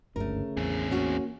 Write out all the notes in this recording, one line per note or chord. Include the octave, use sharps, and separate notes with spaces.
G1 D2 G#2 C#3 A3 A#4
A1 E2 C4 G#4
A#3 C#4 F#4